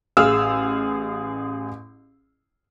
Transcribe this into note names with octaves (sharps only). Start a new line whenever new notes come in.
A1 G#4 F5 E6 F6